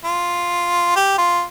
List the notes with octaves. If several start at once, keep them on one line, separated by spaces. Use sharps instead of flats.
F4
G4
F4